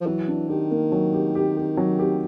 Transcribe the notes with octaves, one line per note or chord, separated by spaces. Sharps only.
F3
E3 F#3
D4
D#3 G4
A#3
F#3
G4
G4
G4
F#3
G4